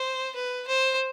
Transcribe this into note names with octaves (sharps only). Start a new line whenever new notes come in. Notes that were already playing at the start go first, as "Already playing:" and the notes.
Already playing: C5
B4
C5